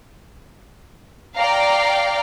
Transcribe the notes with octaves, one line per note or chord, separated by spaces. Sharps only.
D5 F5 G5 A#5